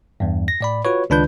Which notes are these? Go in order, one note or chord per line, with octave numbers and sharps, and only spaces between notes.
E2 G2
A#6
A2 D5 B5
F4 F#4 B4 C#5
C#2 D#3 D4 F4 B4 G6